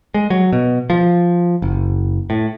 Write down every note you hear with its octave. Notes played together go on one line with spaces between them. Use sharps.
G#3
F#3
B2
F3
F#1
A2